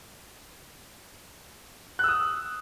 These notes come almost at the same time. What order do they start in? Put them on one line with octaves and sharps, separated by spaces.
F#6 E6 D#6